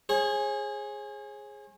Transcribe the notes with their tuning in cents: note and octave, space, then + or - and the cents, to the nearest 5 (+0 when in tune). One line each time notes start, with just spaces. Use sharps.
G#4 +0 C#5 -45